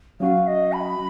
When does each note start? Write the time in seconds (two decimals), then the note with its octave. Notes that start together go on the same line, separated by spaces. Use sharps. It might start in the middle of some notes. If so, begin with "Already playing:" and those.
0.20 F#3 C#4 F#4 F5
0.47 D#5
0.72 B5